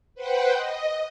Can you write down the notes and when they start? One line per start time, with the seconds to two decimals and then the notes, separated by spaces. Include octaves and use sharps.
0.15 B4 C5 F#5 G5
0.53 D#5